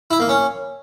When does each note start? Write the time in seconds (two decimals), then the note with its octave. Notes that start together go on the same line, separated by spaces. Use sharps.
0.11 E4
0.20 A#3
0.29 C#4